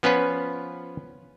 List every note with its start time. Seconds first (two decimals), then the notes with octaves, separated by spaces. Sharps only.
0.03 F3 B3 C#4 F4 B4